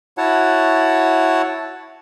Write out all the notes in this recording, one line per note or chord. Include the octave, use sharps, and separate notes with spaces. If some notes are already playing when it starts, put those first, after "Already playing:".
E4 F#4 C#5 F#5 A5